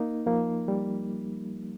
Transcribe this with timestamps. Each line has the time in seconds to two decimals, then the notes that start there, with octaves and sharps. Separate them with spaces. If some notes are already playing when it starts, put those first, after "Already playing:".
Already playing: A#3 D#4
0.26 F3 A#3
0.68 G3